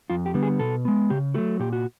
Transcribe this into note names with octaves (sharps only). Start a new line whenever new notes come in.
F2 F4
G4
D3 G3 B3
G#4
B2 A4
G#3 B3
C#3 G4
F#3 A3 F#4
A#2 G4
F#4